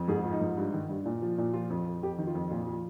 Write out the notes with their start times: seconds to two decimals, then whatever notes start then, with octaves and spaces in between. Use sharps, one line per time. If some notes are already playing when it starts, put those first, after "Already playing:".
Already playing: F2
0.08 G#2 G#4
0.25 F3
0.33 D#4
0.41 G#2
0.57 G2
0.74 D#3
0.89 G2
1.05 A#2
1.22 F3
1.38 A#2
1.53 F3 F4
1.70 F2
1.86 F2
2.03 F2 G4
2.18 D#3
2.27 F4
2.35 F2
2.51 A#2 F4
2.67 F3